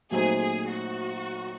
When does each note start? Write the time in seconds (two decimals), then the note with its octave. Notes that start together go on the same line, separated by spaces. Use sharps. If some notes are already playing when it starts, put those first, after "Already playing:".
0.11 A#2 F#3 A3 C4 D#4 G#4
0.39 G#4
0.68 F#4